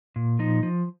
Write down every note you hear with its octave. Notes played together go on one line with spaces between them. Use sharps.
A#2
F3 D#4
F3